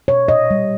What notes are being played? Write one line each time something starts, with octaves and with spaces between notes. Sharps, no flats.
B2 C#5
A#2 D#5
G3